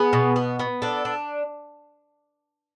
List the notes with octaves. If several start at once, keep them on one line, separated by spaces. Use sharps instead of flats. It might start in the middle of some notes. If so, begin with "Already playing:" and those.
Already playing: B3 G#4
B2
B3
B3
D4 A4
D4